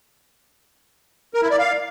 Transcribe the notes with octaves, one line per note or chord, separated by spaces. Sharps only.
A#4
E4
D5
F5